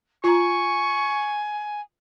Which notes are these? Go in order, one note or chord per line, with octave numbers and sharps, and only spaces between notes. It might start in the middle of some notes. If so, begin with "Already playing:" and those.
F4 G#5 A#5 C#6